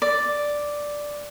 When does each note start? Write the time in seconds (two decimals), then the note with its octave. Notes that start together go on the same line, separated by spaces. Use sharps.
0.02 D5